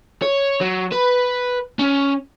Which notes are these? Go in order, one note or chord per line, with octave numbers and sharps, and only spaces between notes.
C#5
F#3
B4
C#4